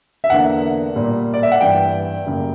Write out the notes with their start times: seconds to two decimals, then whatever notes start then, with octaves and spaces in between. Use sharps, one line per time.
0.24 E5
0.30 E2 D3 A#3 F#5
0.96 A#2 G3 A#3
1.34 D5
1.43 E5
1.52 F#5
1.60 G2 E3 G3 G5
2.26 F#2 C#3 G3 A#3